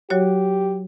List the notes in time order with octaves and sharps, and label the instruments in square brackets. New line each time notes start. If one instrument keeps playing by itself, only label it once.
[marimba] F#3 F#4 C#5 [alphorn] G4